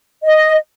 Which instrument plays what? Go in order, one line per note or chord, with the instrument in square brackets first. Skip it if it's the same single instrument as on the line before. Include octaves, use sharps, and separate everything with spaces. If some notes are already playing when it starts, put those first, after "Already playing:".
[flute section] D#5